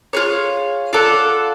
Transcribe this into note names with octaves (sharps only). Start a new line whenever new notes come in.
F4 G#4 C#5
F4 A4 D5 F#5